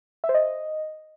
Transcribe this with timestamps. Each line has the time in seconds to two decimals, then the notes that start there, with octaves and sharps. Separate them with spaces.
0.24 E5
0.29 C5
0.34 D#5